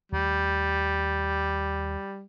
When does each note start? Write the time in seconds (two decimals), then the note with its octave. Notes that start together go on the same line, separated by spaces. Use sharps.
0.12 D#2 G3 A3